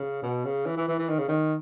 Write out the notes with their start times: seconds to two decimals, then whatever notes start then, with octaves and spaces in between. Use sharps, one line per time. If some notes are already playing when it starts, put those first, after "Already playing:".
Already playing: C#3
0.23 B2
0.45 C#3
0.66 E3
0.77 E3
0.88 E3
0.99 E3
1.09 D#3
1.19 C#3
1.28 D#3